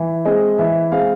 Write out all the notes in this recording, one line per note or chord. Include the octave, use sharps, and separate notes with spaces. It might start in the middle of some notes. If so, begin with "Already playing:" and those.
Already playing: E3
G#3 C4 D#5
E3 E5
G#3 C4 F5